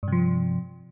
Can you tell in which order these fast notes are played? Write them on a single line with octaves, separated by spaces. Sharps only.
G2 C3 F3